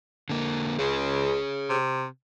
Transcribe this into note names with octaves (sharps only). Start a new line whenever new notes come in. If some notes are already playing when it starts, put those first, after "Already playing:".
D3 A#3
C#2 G#4 C#5
C3